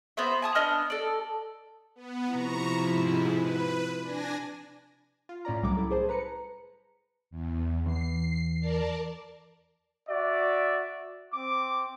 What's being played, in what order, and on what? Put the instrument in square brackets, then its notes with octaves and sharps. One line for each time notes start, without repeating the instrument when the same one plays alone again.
[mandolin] B3 F#4 C5 E5
G#5 A5 D#6
B3 D4 D#5 F6
A4 D5
[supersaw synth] B3
[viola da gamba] C3 F3 E4 [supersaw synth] A#5 C#6
[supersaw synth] G#2
B4
D4 G#5 A#6
[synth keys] F4
A2 C#4 D5 A#5
C2 F#3 G3 A3 D6
E4 A4
G#4 C5 A5
B4 A#5 C#7
[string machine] E2
[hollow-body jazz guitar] E2 [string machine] C7
[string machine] A#4 D5 A5
[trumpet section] F#4 D5 E5
C4 D6